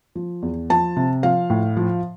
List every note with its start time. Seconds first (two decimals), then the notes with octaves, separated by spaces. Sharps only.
0.15 F3
0.42 E2
0.70 F3 A5
0.96 C3
1.23 F3 F5
1.50 A2
1.77 F3